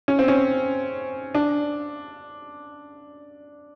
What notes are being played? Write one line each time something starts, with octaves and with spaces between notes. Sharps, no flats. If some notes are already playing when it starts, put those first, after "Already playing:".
C#4
C4
C#4
D4